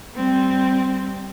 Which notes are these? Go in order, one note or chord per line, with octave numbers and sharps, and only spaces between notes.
G3 C4